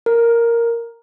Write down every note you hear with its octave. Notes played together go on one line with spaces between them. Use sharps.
A#4